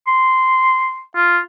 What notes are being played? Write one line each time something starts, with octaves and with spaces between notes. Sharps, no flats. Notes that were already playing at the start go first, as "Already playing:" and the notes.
C6
F4